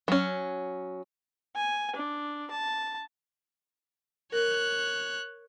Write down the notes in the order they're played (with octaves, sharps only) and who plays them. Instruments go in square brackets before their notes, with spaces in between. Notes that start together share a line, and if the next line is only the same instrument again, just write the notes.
[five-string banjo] F#3 C#4
[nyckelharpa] G#5
D4
A5
[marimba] A#4 [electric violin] C#5 F#6